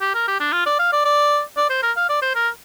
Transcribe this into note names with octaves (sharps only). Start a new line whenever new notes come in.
G4
A#4
G4
D4
F4
D5
F5
D5
D5
D5
C5
A#4
F5
D5
C5
A#4